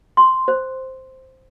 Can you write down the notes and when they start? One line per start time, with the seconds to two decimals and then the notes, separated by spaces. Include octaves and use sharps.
0.17 C6
0.48 C5